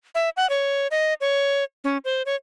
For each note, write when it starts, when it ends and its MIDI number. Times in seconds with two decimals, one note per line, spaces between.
0.15 0.29 76
0.37 0.48 78
0.50 0.87 73
0.91 1.14 75
1.21 1.64 73
1.84 1.97 61
2.05 2.22 72
2.26 2.35 73